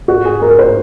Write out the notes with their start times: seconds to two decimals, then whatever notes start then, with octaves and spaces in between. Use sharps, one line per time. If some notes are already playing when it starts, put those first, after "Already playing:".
0.08 F#4
0.25 G#4
0.42 A#4
0.59 C5